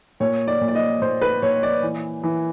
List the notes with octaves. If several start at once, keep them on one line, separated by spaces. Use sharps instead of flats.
A#2 C#5
D5
A#2
D5
D#5
A#2 C5
B4
A#2 C#5
D5
E3
E3